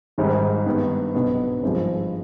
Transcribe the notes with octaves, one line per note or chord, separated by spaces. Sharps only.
G#1 G#2 D#3 G3
G2 D#3 B3
B1 B2 B3 D4
G#1 G2 F3 G#3